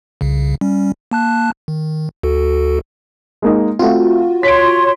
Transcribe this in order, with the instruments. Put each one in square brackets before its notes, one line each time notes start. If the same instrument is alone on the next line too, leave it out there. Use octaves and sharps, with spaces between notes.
[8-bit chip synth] C2 C#3
G3 C#4
A#3 A5 F#6
D#3
D2 F#4 A4
[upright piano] G#3 A#3 D#4
[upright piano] A3 C4 [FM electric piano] F4 F#4
[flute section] C#5 C6 [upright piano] B6 D7